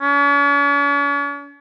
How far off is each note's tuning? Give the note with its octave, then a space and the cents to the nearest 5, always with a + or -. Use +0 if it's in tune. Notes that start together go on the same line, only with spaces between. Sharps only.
C#4 +45